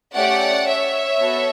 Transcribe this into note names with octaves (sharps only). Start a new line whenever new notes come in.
A3 C#4 G4 D5 F#5
C#5 E5
B3 F#4 A4